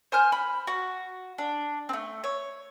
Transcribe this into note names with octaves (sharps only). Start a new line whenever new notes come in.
C5 G#5 F6 G6
B5
F#4
D4
A3 C4
C#5